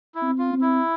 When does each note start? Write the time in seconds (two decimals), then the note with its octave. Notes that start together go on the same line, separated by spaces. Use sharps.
0.15 E4
0.22 C4
0.38 F4
0.53 C4
0.61 E4